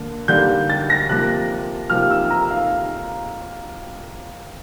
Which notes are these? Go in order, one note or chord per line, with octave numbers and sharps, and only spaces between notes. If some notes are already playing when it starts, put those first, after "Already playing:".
Already playing: D3 A#3
D3 G3 A#3 G6
A6
A#6
C3 F3 A#3 F#6
C3 F3 A#3 F6
E6
A#5
F5